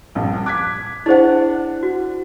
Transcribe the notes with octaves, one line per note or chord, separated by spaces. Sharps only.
A#1 G2
D6 F#6 G#6 B6
D4 E4 G#4 C5 F#5
F#4